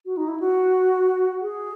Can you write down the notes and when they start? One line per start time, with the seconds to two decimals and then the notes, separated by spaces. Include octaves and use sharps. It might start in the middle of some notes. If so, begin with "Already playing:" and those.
0.06 F#4
0.17 D#4
0.28 E4
0.40 F#4
1.41 G#4